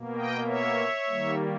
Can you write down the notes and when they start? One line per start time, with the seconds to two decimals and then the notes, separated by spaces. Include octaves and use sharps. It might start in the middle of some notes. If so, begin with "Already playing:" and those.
Already playing: B2 A#3
0.16 D#5 G5
0.46 C#5 E5
1.07 D#3 G3 A#3